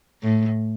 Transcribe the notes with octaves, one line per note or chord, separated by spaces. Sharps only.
A2